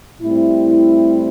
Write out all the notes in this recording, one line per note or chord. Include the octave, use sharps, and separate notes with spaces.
A2 G3 C4 E4